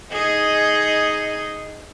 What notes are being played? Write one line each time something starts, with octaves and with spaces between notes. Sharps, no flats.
D#4 G#4 D#5